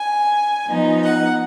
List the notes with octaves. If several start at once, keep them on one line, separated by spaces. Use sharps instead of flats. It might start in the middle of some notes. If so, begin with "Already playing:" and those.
Already playing: G#5
F3 B3 D#4
F#5